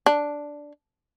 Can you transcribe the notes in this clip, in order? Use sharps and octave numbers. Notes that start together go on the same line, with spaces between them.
D4